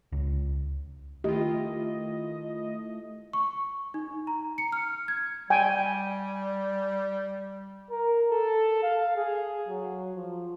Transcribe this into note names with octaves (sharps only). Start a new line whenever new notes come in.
C#2
D#3 A3 E4 F4 G4 D#5
C#6
D#4
A#5
C#7
F6
G#6
G3 G5 G#5
A#4
A4
F5
G#4
F#3
F3